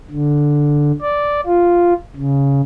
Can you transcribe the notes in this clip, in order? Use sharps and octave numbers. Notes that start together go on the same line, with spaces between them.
D3
D5
F4
C#3